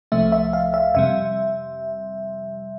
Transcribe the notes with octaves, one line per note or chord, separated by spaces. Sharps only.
C2 C3 F3 A3 E5
E5
F5
E5
F2 C3 G3 E5